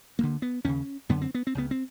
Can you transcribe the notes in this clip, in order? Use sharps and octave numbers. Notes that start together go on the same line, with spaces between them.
D2 D3 A#3
B3
D#2 C#3 C#4
F#2 D3 B3
C4
B3
C4
C#2 C#3 B3
C4